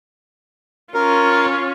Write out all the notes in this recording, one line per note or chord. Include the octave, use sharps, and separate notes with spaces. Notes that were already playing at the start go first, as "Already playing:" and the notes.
C#4 F4 A#4